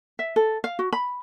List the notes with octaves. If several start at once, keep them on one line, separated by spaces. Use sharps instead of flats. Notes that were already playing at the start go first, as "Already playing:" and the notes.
E5
A4
F5
F#4
B5